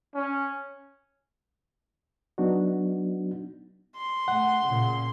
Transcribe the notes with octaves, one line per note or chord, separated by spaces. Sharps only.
C#4
F#3 B3 D4 D#4 F#4
C6
A3 F#5
A#2 C#3